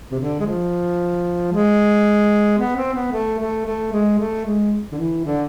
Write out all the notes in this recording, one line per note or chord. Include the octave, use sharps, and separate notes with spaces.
C3
D3
G#3
F3
G#3
B3
C4
B3
A3
A3
A3
G#3
A3
G#3
D3
E3
D3